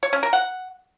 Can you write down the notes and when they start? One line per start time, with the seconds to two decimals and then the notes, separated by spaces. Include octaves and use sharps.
0.03 C#5
0.13 C#4
0.23 A#4
0.33 F#5